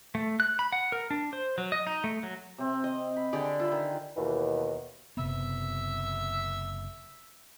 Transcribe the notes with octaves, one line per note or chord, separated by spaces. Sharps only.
A3
F#6
B5
F#5
A#4
D4
C5
F#3
D#5
D#4
A3
F#3
C3 C4
D#5
B5
D3 G4 G#4 D5 G5
F4 E5 B5
D#3
D#2 B2 E3
F#1 C3 B3 E5